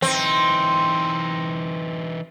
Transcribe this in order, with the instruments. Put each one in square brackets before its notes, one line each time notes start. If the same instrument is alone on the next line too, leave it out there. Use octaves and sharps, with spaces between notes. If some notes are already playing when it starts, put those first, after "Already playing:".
[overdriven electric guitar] E3 D#4 [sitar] C4